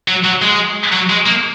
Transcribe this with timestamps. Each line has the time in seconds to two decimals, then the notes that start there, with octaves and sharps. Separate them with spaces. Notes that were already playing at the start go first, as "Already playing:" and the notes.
0.08 F#3
0.24 F#3
0.42 G#3
0.92 F#3
1.10 G#3
1.26 A#3